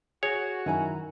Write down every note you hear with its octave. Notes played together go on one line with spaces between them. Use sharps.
F#4 G#4 C#5
F#2 D#3 E4 G#5 A#5